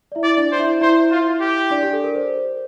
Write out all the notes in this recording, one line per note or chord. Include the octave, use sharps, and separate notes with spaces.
D5
E4 E5
D5
D4 D5
C5
E4 E5
E4 C5 E5
F4
G4
D4 D5
G4
A4
A#4
C5